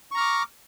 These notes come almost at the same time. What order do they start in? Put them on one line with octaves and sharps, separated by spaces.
C#6 A#5 F6 D6